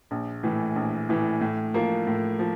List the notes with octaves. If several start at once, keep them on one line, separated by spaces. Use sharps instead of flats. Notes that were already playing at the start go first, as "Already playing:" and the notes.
A#1
A2 E3
A#1
A2 E3
A2
F3 A#3
A2
F3